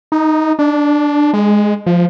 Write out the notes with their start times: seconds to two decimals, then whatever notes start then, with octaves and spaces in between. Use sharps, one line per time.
0.12 D#4
0.59 D4
1.33 G#3
1.86 F3